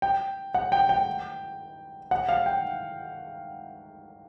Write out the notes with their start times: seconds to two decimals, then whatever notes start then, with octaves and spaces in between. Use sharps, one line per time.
0.02 G5
0.54 F#5
0.72 G5
0.89 G5
2.11 F#5
2.29 F5
2.46 G5